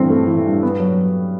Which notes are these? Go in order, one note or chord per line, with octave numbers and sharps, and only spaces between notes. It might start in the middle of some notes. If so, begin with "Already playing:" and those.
Already playing: G2 E3 A3 C4
A3
E3
G2
B3
F#3